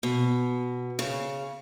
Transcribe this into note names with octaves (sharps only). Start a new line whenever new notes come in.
B2
C#3